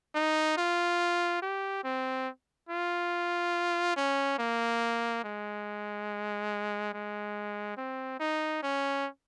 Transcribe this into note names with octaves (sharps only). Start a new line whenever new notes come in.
D#4
F4
G4
C4
F4
C#4
A#3
G#3
G#3
C4
D#4
C#4